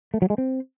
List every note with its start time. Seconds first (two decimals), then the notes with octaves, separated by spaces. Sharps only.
0.14 A3
0.22 F#3
0.30 G#3
0.38 C4